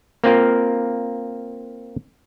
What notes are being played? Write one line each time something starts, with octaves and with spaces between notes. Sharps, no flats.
A#3 C4 F4 A#4